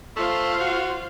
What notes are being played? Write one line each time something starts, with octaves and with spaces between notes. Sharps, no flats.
A3 F4 C5 F5
F#4